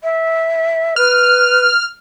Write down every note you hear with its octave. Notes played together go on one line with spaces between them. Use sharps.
E5
B4 F6